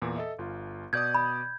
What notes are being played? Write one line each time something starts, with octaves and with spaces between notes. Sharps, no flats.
E2 A#2 E3
A4 D#5 E5
G1 F4
B2 D5 D#6 G6 G#6
B5